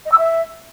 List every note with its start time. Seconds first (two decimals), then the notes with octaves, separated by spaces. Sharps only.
0.05 D#5
0.11 E6
0.18 E5